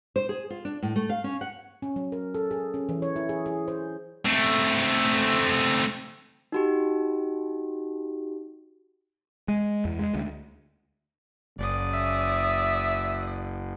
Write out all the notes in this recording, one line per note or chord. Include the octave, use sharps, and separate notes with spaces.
C5
G#4
F4
D4
A2
A3
F5
C#4
F#5
C#4
F#3
A#4
A4
G#4
C#4
E3
C#5
E4
G#4
G#4
C5
A3 C4
D#4 F#4 G4
G#3
E2
G#3
D2
F#1 D5 D#6
E5